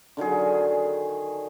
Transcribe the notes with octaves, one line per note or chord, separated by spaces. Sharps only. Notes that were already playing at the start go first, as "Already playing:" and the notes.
D3 D#3 F#3 G#4